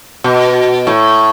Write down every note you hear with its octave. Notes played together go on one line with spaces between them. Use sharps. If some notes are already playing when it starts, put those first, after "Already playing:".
B2
A2